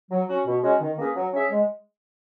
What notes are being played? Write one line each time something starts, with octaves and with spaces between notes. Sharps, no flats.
F#3
C#4 F#4
B2
G#3 C#4 F#4 C#5
D#3
A#3 C#4 G#4 B4
F#3
C#4 G#4 C#5 E5
G#3